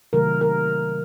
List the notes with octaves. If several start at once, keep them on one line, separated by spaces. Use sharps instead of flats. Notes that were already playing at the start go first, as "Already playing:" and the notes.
C3 D#3 F#3 A3 A#4
A#4